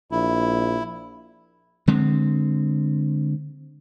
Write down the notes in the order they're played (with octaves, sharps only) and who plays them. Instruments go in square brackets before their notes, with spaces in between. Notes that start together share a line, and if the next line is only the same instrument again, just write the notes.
[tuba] A#1 [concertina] E4
[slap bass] D3 G#3 C4